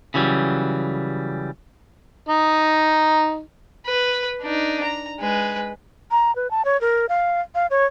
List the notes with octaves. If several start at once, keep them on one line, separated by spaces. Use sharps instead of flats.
C#3 E3 F#3 G3
D#4
B4
D4 D#4
A#5
G#3 B4
A#5
B4
A5
C#5
A#4
F5
F5
C#5